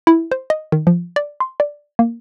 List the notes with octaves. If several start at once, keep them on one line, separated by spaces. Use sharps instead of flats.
E4
C5
D#5
D#3
F3
D5
C6
D5
A#3